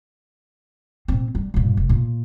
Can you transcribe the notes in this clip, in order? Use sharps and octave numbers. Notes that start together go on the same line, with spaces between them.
A#2 C4
G3
G2 A#2
F1
A#2